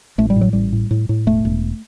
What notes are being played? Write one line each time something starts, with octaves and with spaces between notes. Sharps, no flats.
A1 A3
G3
A2
F#3
A1 G3
A2
A2
A2
E1 A3
E1